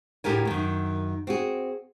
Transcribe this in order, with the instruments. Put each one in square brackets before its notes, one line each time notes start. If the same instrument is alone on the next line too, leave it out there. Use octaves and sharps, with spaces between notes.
[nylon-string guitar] D2 A2 G4 A#4 G#5
F#2 D#3
C4 F#4 G#4